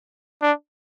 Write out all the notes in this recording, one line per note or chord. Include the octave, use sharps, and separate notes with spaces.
D4